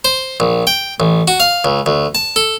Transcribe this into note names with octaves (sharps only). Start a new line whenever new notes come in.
C5
A#1
G5
A1
F#4
F5
C#2
D2
A5
A4